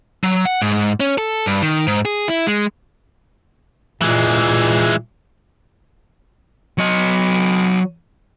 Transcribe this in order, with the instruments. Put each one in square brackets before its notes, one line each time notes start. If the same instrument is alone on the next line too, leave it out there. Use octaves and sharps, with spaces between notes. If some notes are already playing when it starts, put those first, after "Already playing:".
[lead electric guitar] F#3
F#5
G#2
C#4
A4
G2
D#3
G#2
G#4
E4
G#3
[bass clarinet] A#2 [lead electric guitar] E3 G#3
[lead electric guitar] F#3 D#5